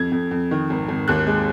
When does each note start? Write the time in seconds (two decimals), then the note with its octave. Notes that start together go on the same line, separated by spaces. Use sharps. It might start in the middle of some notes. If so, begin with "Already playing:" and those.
Already playing: F2 G#6
0.12 F2
0.31 F2
0.51 D#3
0.70 G#1
0.88 G#1
1.08 D#2 F#6
1.27 G#3